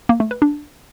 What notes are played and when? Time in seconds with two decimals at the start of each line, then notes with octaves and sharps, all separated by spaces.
0.09 A#3
0.20 A3
0.31 B4
0.42 D4